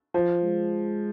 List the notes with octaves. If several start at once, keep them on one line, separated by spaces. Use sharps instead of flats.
F3
G#3